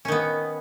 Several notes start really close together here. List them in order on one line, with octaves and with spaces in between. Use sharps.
C#4 D#3 B3